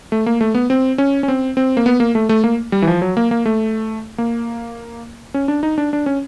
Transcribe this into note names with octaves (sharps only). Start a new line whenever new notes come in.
A3
A#3
A3
B3
C4
C#4
C#4
C4
C4
A#3
B3
A#3
A3
A3
A#3
G3
E3
F3
F#3
A#3
A#3
A3
A#3
C#4
D4
D#4
D4
D4
C#4